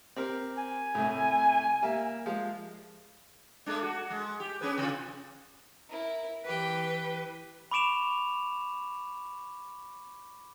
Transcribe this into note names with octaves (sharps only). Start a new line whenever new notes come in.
C4 G4 A#4
G#5
C2 A2
G3 A#3 E5
F3 G#3 F5
G#3 A3 D4
F#4
G#3
G4
C#4 G#4 B4
C3 F4
E4 A#4
E3 G4 B4 G5
B5 C#6 D6 D7 E7 F7